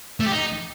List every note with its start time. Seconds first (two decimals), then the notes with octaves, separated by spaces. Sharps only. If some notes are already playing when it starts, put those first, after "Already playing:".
0.20 A3
0.26 G4
0.32 D#4